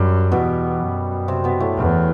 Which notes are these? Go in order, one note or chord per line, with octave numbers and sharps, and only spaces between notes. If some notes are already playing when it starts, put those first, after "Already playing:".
Already playing: F#2 G3
E2 B2 B3
F#2
C3 C4
B2 B3
A2 A3
E2